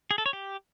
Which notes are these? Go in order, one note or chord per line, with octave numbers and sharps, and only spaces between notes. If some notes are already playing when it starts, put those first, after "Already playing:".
G#4
A4
C#5
G4